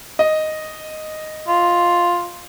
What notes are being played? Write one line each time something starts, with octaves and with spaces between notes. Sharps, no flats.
D#5
F4